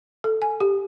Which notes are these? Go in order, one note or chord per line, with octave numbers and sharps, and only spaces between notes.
A4
G#5
G4